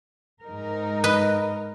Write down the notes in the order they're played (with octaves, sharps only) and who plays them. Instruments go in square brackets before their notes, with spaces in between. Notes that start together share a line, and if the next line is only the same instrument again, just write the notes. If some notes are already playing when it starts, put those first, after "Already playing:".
[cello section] G#2 D#4 A#4
[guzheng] B4 D#5